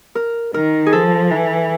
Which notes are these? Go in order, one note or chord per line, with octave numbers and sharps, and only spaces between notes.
A#4
D#3 A#4
G#4
F3 A4
E3